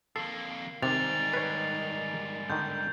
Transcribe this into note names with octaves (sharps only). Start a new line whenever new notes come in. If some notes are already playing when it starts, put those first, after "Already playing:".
F2 A#3 A4 C7
G#2 C3 D#3 G3 A6 F7
B4 C#5 C7
D3 D#3 G6